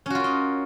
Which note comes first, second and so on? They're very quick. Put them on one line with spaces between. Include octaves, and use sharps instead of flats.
C#4 F#4 F4 A#4 D#5